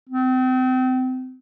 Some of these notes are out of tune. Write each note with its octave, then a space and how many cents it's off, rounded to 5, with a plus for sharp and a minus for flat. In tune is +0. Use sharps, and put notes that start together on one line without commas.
C4 -35